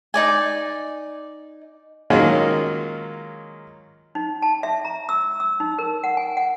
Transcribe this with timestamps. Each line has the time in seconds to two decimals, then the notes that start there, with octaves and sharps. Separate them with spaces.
0.14 D#4 D5 G#5
2.10 D#3 F#3 G#3 A#3 C#4 F4
4.15 D#4
4.42 A5
4.63 E5
4.85 A#5
5.09 E6
5.40 E6
5.60 D#4
5.78 A#4
6.04 F#5
6.17 G#5
6.37 F#5